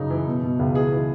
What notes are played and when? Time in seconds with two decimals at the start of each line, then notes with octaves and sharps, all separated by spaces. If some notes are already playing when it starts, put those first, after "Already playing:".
Already playing: F#2 C#3 D#4
0.10 E3
0.27 B2
0.43 B2
0.59 C#2
0.75 E3 G#4
0.92 E3